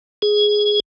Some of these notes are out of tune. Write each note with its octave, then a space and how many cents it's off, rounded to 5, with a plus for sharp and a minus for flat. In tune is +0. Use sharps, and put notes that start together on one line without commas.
G#4 +5